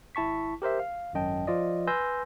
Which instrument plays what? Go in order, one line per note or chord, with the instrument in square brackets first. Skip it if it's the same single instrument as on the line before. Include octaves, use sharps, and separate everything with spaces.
[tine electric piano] G#1 E4 A5 C#6 B6
G4 A#4 C5 E5
F5
G#1 F#2 D#5 G5 A5
F3 F4 D5 D#5
B4 G#5 C6 E6 G6 A#6